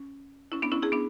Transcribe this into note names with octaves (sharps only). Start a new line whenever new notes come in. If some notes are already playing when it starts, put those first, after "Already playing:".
Already playing: C#4
C#4 E4
B3 D4
C#4 E4
E4 G#4
B3 D4